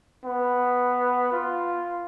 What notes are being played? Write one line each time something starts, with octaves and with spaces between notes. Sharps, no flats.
B3
F4